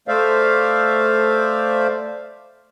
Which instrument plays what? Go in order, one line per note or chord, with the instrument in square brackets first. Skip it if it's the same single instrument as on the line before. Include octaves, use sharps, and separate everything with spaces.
[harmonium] A3 C5 D5 E5 F5